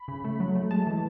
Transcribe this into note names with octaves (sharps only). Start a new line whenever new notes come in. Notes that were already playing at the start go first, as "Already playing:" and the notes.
Already playing: B5
C#3
A3
F#3
A3
G#3 A5
E3